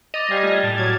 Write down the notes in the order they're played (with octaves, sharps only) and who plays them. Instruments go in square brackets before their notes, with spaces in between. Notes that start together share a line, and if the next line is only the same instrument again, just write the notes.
[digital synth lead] D#5 [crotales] D6 A6 F7
[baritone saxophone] G3 [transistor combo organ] C5 F5 G#5
[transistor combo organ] A3 F4 G#5
[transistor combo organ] A2 A5 [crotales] D7 G7
[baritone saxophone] F#3 [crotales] F6 [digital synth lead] G#6